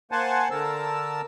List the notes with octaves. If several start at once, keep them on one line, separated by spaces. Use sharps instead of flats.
A#3 C5 F#5 G#5 A5
D3 A#4 A5 E6